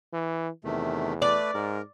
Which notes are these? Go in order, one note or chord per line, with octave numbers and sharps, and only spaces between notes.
E3
E2 C3 D#3 A3
A3 B4 D5
G#2 A#4